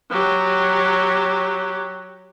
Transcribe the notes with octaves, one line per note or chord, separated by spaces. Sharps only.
F#3 G4